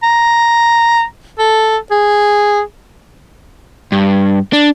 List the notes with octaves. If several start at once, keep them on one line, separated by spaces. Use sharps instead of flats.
A#5
A4
G#4
G2
D4